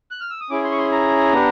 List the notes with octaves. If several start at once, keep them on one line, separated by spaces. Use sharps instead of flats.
F#6
F6
E6
D#6
C#4 E4 G#4 D6
C6
C#6
C6
A#5
B3 D4 G4